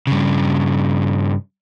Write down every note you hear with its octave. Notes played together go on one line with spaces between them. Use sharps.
G2 C#3